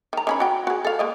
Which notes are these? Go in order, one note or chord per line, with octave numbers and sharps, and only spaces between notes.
D#3 A#5
D#3 C#4 B5
F#4 G5
F#4 G#4
A4 F5
G#3 A#3 D#5